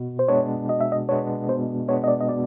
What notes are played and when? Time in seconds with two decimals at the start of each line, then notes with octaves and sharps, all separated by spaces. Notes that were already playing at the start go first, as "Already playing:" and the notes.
Already playing: B2
0.19 C5
0.28 G#3 B3 D4 C#5
0.69 B2 D#5
0.80 E5
0.92 D#5
1.09 G#3 B3 D4 C#5
1.49 B2 C5
1.88 G#3 B3 D4 C#5
2.04 D#5
2.08 D5
2.20 D#5
2.29 B2 D5